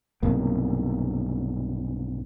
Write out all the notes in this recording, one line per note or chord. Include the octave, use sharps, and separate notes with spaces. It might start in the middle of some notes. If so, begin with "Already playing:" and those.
B1 G2 C3 A#3